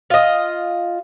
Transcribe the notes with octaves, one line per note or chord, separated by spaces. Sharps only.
F4 D#5